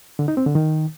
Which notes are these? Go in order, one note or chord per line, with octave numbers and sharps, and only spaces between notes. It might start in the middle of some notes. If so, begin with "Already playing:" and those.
D3
D#4
C4
D3
D#3